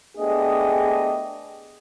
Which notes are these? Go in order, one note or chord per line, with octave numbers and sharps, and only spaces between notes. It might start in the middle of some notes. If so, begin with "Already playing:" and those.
A3 B3 D4 G4 G#4 D#5